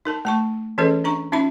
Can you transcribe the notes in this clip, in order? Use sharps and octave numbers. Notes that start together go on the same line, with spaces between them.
D#4 A#4 A5
A3 A5 C#6
E3 C#4 G#4 A4 B4 D#5
D4 A#5 C#6
C#4 D#4 F4 E5 B5